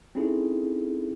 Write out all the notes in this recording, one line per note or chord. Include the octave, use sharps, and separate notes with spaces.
C4 C#4 D#4 E4 G#4 A4